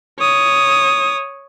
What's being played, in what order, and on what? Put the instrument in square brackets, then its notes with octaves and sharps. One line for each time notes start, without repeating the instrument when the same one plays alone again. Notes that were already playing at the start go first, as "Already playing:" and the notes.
[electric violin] C#5 D#6